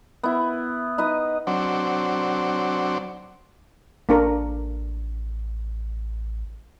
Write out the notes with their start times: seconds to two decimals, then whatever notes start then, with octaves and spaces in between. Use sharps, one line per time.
0.23 B3 E4
0.98 D#4 B4 D#5
1.47 F#3 C4 D4
4.09 A1 A#3 D4 A#4